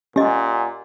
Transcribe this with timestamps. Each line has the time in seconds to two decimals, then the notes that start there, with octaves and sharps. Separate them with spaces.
0.16 A#2 C#4 G4 D#5 F#5 G#5